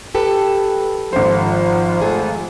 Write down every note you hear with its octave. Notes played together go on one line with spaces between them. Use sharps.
G4 A4 B4
G#1 F3 C5
A3 F4 G#4 A4